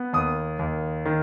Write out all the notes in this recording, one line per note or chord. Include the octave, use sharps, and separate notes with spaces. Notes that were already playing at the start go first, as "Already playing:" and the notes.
Already playing: B3
D#2 D#6
D#2
D#3